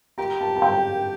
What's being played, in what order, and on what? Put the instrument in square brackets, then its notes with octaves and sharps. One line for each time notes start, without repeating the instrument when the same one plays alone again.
[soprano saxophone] G4 [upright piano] A#5
[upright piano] A5
A5
G5